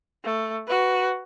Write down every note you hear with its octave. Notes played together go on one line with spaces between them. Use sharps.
A3
F#4 B4